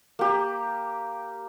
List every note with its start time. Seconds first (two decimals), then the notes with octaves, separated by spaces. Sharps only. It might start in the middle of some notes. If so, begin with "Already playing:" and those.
0.19 A#3 G4